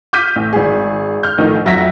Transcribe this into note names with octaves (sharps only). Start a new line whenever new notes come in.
D6 F6 G6 B6 D#7
A1
G#1 G#4
F6 G6
A1 D#3 F3 A3 D#4
F2 F#3 E5 F#5 A#6 B6